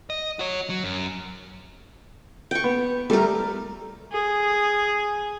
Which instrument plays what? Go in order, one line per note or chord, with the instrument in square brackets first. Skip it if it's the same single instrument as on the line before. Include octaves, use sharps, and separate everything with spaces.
[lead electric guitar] D#5
F#4 C#5
F#3
F#2
[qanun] G5 C#6
[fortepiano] B3
[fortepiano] G3 A3 [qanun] A4 A#4
[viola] G#4